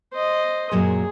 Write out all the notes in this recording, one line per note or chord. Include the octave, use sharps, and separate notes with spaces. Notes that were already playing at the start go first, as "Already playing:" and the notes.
C5 D#5
F#2 A#2 F#3 G#4